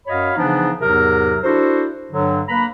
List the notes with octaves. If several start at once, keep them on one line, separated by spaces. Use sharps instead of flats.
F#2 F#4 C#5 D#5 F5 B5
C#3 E3 F3 B3 D4 D#4
E2 G#2 C3 F#3 A#4
D4 E4 F#4 A4 C5
G2 D3 F#3
A#3 B4 A#5 B5